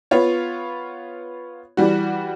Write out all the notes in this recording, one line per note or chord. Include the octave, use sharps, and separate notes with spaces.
B3 F4 C#5
E3 G3 F#4